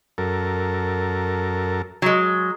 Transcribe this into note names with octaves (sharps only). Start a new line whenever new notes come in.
F#2 A4 A#4
F#3 G#3